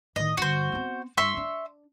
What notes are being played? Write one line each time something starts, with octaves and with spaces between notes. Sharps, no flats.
A2 D#3 D#5
G2 D3 F#4 C5
B3 C4
G2 E5 C6 C#6
D4